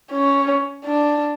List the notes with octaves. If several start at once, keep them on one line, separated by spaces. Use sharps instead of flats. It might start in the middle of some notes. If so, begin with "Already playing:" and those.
C#4
D4